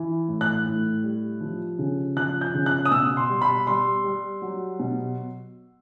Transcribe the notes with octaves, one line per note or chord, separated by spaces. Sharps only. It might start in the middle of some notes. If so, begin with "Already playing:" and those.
Already playing: E3
A2
F#6
A2
G3
F3
C#3
F3 F#6
G6
C#3
F#6
D#6
B2 E6
C6
G3
B5
G3 C6
G3
F#3
B2